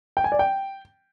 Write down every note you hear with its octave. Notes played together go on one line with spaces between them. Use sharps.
G5
G#5
D5
G5